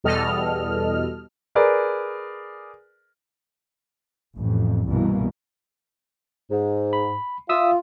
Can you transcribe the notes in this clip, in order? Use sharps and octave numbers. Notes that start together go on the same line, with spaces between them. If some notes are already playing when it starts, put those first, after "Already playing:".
E2 B2 G3 A4 D#5 F6
G#4 A#4 B4 D5
A1 F2
C2 G2 B2 E3 A#3
G#2
B5
F4 E5 D#6 E6